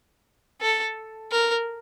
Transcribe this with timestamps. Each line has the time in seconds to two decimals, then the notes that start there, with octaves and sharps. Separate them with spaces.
0.61 A4
1.31 A#4